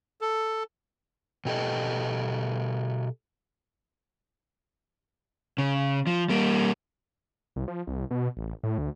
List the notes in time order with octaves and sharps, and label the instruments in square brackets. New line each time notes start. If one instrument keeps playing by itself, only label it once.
[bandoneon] A4
[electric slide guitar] B2 G4 A4 D#5
[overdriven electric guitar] C#3
F3
G3 A#3
[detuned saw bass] C2
F3
C2
B2
A1
A2
D2